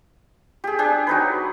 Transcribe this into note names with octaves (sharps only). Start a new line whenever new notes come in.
G4 G#4
D4 G4 G#4
F#3 D#4 B4